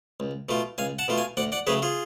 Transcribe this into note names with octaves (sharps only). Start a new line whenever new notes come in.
C#2
B2 A3 F4
C#2 F5 G#5
F#5 A5
B2 A3 F4
F5 G#5
D2 D5 F#5
D5 F#5
C#3 F#3 A3 G#4 B4
F4 G#4